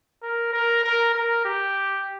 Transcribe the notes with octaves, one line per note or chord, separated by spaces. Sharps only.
A#4
A#4
A#4
A#4
G4